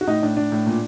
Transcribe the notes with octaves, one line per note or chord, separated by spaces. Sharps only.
F#4
A2 D#4
A2 D4
A2 D4
A2
A#2